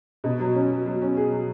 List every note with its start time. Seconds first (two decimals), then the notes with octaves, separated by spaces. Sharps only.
0.24 B2
0.40 F#3
0.55 C#4
0.70 F#3
0.86 F#3
1.02 C#4
1.17 G#4
1.32 F#3